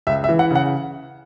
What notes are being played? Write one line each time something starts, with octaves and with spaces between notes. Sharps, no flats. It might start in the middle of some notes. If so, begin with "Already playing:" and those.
C#2 E5
E5
E3
F#5
C#3
F#5